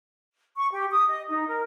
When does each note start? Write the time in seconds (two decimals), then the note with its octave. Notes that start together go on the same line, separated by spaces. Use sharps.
0.57 C#6
0.72 G4
0.92 D#6
1.08 D#5
1.29 D#4
1.48 A#4